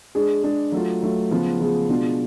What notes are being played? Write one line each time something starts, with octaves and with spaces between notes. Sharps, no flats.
G#3 D4 G#4
G#3 D4 G#4
F#3 A3 F4
F#3 A3 F4
C#3 F3 B3 F4 G#4
C#3 F3 B3 F4 G#4
B2 G#3 D4 F4